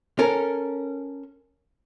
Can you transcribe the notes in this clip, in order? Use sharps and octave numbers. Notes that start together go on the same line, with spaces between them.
C#4 A4 A#4